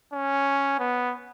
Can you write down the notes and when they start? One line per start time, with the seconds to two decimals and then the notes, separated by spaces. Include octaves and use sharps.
0.13 C#4
0.79 B3